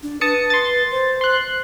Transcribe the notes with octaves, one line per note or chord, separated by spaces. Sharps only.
D4
B4 A5 D#6 C#7
C6 A6
C5
C6 F#6